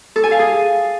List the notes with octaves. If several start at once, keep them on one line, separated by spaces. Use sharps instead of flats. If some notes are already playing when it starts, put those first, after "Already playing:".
A4
G#5
F5
G#4